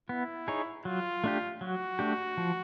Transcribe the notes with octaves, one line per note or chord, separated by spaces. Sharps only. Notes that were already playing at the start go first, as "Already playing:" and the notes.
B3 E4
D#4 G#4 C#5
F#3 F4
A3 D4 G4
F#3 F#4
A3 D4 G4
F3